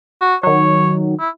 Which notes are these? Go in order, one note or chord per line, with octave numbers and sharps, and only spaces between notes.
F#4
D#3 F#3 C#5
E4